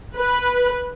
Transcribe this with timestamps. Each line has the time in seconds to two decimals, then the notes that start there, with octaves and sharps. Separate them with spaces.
0.16 B4